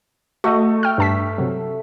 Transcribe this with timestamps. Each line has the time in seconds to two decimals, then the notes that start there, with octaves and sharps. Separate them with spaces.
0.44 A3 F#4 D#5
0.83 G5 F6
0.98 G2 A5 B6
1.38 C3 F#3